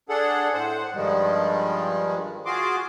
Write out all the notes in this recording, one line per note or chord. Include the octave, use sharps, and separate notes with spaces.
D4 G#4 A4 F#5
A2 C5 F#5
G2 D#3 F3 G3 G#3
F4 F#4 G#4 C6 D6